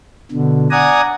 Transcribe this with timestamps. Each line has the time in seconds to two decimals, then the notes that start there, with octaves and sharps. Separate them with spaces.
0.31 B2 D3
0.71 D5 F#5 G#5 A#5 D#6